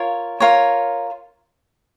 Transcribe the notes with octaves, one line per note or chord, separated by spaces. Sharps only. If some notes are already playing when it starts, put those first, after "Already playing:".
Already playing: F4 A#4 C#5
F4 A#4 C#5